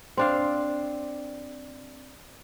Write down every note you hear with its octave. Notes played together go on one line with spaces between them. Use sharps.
C4 D4 F5